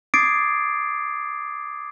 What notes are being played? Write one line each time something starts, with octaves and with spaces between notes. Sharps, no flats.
D6 D#6 G#6 A6 C7 D7